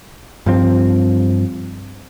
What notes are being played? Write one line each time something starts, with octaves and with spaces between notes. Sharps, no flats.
G2 F3 C4